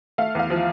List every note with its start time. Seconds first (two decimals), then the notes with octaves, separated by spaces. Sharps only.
0.18 A3 F5
0.35 E2 F5
0.50 F3